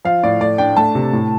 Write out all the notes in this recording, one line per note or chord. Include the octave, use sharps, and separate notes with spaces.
F3 F5
A2 D5
A3 D5
D4 G5
A3 A5
C3
A2